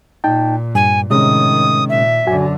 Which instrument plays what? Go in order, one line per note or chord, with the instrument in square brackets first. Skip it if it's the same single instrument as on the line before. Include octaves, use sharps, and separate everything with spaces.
[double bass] A#2 [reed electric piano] D#4 G5 A5
[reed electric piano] G2 [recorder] G#5
[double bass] A2 D#3 [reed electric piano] C3 G#3 C#4 [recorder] D#6
[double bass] A#2 [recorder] E5
[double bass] F#2 D3 [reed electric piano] F#4 G#5